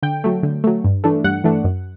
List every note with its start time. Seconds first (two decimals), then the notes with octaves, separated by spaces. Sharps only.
0.02 D3 G5
0.24 F#3 A3
0.43 D3
0.64 F#3 A3
0.84 G2
1.04 E3 A3 D4
1.24 G2 F#5
1.44 E3 A3 D4
1.64 F#2